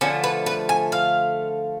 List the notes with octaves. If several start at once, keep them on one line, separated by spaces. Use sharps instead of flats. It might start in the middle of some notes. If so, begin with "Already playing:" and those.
D3 F3 A3 C#4
B4
B4
G#5
F5